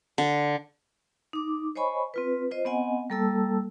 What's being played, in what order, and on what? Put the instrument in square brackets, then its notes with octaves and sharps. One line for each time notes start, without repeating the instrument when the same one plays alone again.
[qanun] D3
[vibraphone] D#4 D6
C5 C#5 D#5 G#5 B5 C#6
C4 F4 B4
F4 C5 D#5
B3 C4 D#5 F#5 G#5
G3 A#3 A4 A5 E6